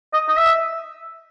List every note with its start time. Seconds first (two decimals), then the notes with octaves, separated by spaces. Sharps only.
0.13 D#5
0.28 D#5
0.37 E5